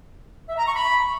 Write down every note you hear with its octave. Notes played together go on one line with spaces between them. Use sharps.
E5
A#5
C#6
B5